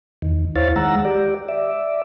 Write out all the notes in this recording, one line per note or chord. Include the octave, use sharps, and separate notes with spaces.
E2 D#3
D#2 E4 C5 C#5 F5 A6
D#3 G#3 F#5 A#5 E6
G4 D5
D5 E5